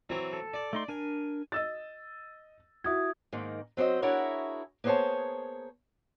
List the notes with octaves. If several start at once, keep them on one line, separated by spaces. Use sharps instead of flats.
E3 F#3 C4
A4
D5
A3 D#4 C6
D4 A#4 G#5
D#5 E6 A6
E4 F#4 D#6 G#6
G#2 D#3 A#3
F#3 C4 C5 D#5
D4 E4 F#4 G#4 A#4 C#5
A#3 B3 G#4 C5 C#5 A5